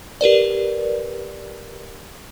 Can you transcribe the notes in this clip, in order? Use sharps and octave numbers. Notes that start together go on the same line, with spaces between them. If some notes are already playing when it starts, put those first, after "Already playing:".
G4 A#4 B4 D5